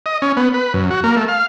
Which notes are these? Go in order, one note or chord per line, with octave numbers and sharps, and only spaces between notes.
D#5
C#4
B3
B4
F#2
F#4
A#3
A3
F5